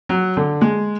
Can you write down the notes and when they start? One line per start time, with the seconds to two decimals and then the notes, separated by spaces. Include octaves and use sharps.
0.09 F#3
0.37 D3
0.61 G#3